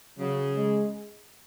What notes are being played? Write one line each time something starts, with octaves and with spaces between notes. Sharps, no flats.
C#3 F#3
G#3